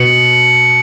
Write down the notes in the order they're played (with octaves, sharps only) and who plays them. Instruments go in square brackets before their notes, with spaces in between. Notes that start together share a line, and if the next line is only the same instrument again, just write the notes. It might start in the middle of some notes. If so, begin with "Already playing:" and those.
Already playing: [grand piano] B2 [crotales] C#7 F#7